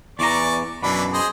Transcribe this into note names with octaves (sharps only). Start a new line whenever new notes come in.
E2 E3 D5 A#5 C#6 D6
F#2 B2 E3 D4 B5
G#4 C5 D#5